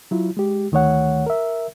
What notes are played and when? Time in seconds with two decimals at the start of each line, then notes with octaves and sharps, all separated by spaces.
0.11 F#3 E4 F4
0.37 G#3 G4
0.72 D2 D#3 A3 C#5 F#5
1.26 A#4 E5